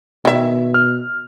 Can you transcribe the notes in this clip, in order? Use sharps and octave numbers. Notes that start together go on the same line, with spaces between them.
B2 D#3 E5
F6